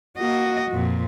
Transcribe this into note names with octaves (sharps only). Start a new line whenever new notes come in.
A#3 F#4 D#5
F2 A#2